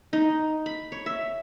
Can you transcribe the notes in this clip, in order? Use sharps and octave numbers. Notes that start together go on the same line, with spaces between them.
D#4
B5
C#5
E5